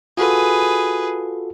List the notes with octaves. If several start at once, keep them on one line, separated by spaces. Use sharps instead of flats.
F4 F#4 G#4 A4 B4